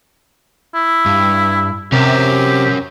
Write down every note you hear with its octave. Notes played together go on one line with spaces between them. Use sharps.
E4
G2
C3 C#4 G4 A#4